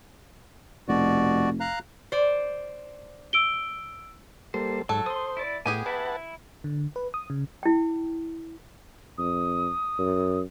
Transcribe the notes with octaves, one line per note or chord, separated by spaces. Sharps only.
F1 B2 F#4 D5
F5 A#5 F#6
C5 D5
E6 D7 G7
G3 A#3 A4 C5
G#2 F#3 A4
C5 C6 D#6
E4 D5
A2 B3 G4 G#4 G#5
E4 B4 E5 F#5 A5 B5
D3
B4
D#6
C#3
E4 G5
F2 D#6
F#2